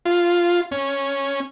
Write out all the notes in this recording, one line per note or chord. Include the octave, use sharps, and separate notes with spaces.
F4
C#4